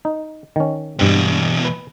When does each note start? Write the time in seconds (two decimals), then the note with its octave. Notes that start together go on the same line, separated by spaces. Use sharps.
0.05 D#4
0.56 D#3 C#4
0.99 E2 G2 B2 C4
1.65 B4